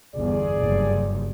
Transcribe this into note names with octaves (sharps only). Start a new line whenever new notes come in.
G1 E2 G#4 D5
F#1 G2